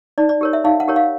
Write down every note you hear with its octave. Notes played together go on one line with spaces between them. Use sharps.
D#4 D5
D5
G4 A#4 C#5
E5
D#4 F5
F#5
G4 A#4 C#5
F5